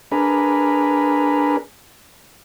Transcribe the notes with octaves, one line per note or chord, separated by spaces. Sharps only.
D4 G#4 A#4 B4